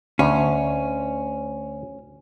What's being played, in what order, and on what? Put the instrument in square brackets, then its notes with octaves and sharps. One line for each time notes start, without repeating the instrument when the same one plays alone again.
[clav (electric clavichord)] D2 [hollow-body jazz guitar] C#4